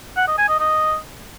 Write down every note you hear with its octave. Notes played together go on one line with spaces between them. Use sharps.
F#5
D#5
G#5
D#5
D#5